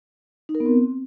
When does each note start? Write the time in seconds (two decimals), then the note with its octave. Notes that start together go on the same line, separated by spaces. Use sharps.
0.49 D#4
0.55 A#4
0.60 B3
0.66 C4